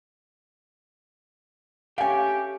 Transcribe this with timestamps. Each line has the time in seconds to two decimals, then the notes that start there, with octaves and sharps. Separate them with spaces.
1.98 A3 C#4 G4 F5 G5 G#5